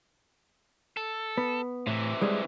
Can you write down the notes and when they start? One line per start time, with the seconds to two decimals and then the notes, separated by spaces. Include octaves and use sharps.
0.97 A4
1.38 B3
1.87 A2 C3 E3
2.21 G3 G#3